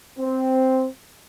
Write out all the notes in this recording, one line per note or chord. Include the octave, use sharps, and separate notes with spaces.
C4